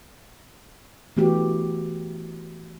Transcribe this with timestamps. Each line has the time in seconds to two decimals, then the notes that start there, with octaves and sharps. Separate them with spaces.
1.17 E3 A3 B3 F#4 G4